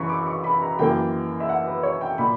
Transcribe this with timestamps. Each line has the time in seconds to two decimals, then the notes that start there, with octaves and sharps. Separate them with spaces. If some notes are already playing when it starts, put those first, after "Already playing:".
Already playing: F#2 E3 B5 C#6
0.09 D6
0.26 C#6
0.44 B5
0.62 A#5
0.79 F#2 E3 A#3 G5
1.40 E5
1.49 F#5
1.66 B4
1.83 C#5
2.01 G5
2.18 A#2 B5